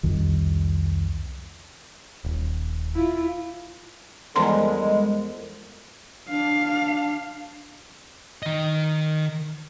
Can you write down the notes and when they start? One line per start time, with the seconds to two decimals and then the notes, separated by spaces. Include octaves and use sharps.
0.03 C2 F2 D#3
2.24 D#1
2.94 E4 F4
4.36 E2 D3 F3 G3 G#3 A#4 C6
6.29 D4 F5
8.43 D#3 D#5